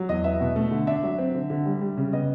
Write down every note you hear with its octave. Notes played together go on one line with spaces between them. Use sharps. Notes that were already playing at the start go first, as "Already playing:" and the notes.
Already playing: F#3
E2 D#5
B3 E5
B2
A3
D3
D4 E5
F#3
C4
D3
D3
G3
G3
C#3
B3 D#5